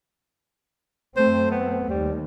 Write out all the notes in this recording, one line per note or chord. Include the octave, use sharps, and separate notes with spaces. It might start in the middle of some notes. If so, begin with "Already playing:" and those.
F#2 A3 C4 C5
B3
D#2 G3